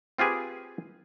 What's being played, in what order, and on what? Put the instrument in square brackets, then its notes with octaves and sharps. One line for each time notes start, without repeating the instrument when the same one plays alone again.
[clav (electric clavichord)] C4 F4 G4 G#4 B4